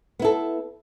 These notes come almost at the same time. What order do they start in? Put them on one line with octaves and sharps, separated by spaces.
B3 E4 A4